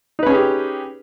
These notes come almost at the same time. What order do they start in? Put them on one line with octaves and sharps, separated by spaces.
D#4 B4 C#4 G#4 G4